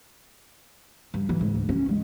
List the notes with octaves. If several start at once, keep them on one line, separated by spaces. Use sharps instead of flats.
G2
E3
G#2
D2
C#4
G#3